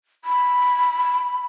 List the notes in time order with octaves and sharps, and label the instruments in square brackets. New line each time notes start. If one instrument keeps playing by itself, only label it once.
[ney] B5